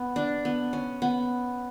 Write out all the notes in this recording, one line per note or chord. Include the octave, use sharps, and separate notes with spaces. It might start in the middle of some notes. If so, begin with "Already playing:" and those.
Already playing: B3
D4
B3
C#4
B3